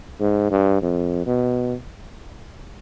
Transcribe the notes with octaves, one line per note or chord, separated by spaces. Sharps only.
G#2
G2
F2
B2